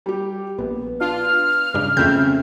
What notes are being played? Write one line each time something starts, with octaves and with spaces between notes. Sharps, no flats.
G3 G4
A#1 B3
D4 F4 F6
G2 C#3 D4
F2 C#3 A3 C4 C#4 E5 G6